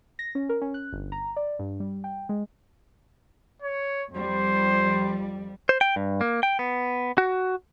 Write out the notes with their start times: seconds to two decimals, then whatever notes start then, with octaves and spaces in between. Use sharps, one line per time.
0.19 A#6
0.35 C#4
0.49 A#4
0.62 C#4
0.74 F#6
0.93 G1
1.12 A#5
1.36 D5
1.59 G2
1.80 G3
2.04 G5
2.29 G#3
3.62 C#5
4.12 F2 F3 G3 C5
5.69 C5
5.81 G5
5.96 G2
6.21 A#3
6.43 G5
6.59 B3
7.18 F#4